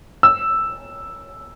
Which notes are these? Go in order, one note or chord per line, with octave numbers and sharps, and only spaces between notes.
E6